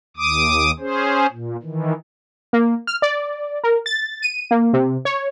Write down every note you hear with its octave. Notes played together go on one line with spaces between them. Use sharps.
D#2 D6 D#6
C#4 G#4 C5
A#2
D#3 E3
A#3
F6
D5
A#4
A6
D#7
A#3
C3
C#5